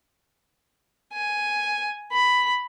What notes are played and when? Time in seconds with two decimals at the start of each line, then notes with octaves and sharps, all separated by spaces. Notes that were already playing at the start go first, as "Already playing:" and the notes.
1.14 G#5
2.12 B5